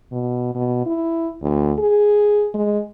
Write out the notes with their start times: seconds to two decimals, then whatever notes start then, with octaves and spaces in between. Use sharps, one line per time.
0.12 B2
0.55 B2
0.86 E4
1.42 D2
1.79 G#4
2.55 G#3